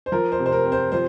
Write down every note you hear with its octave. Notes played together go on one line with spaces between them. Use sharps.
C5
F3 A#4
C5
C3
C5
A#4
C4
C5
F3 C5